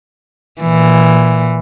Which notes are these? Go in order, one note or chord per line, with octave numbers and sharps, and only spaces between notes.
A#2 E3